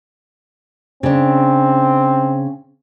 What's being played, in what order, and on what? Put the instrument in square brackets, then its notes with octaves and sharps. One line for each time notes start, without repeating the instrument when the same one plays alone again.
[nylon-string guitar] C#3 D4 [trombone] C4